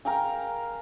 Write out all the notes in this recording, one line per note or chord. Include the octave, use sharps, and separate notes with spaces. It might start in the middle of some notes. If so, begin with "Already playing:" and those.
A#4 F5 G5 G#5